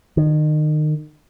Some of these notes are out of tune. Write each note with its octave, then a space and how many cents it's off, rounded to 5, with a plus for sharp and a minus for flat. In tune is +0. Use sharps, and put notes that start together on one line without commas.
D#3 -30